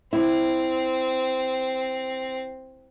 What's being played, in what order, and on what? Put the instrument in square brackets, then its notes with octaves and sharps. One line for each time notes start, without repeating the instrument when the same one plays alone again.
[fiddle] C4 [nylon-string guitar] E4